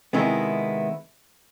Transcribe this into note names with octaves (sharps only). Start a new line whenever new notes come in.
C3 D#3 G#3 B3 E4